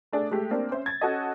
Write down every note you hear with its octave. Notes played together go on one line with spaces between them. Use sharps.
A3 D4 G#4
G#3 A3 G4
A#3 C4 D4
C#4 C5 E5
G#6 A6
C#4 F#4 A4 D#5